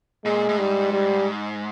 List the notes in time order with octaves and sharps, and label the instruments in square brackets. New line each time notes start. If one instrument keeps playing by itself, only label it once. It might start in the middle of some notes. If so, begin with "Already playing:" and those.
[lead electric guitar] A#2 [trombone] G#3
[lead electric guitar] A2
[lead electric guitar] G#2 [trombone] G3
[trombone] G3